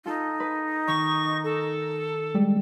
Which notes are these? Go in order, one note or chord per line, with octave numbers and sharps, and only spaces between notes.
D#4 F4 A4
B4
D#3 C#6
A4
G3 G#3